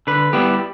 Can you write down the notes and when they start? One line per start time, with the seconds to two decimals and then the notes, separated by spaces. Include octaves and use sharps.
0.07 D3 B4
0.33 G3 B3 E4 G4